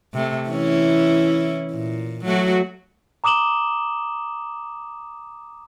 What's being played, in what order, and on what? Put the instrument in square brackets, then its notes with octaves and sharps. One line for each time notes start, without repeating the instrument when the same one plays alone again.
[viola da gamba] C3 A3
E3 C#4 E4
A#2
F#3 A3 F#4
[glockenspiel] A#5 D6 D#6 E7 F#7 G7